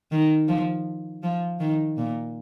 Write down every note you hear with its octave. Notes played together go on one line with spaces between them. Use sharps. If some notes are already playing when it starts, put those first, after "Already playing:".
D#3
F3
F3
D#3
A#2